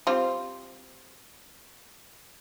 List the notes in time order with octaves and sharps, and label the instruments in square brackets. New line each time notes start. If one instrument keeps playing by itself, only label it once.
[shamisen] G3 C4 F4